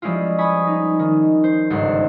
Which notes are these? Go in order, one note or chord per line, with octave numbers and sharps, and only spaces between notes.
F3 G3 G#3 C#4 E4 F4
G#5 B5 C#6 D#6
D#4
D#3
C5
G1 C#2 G#2 G3 F#5 C6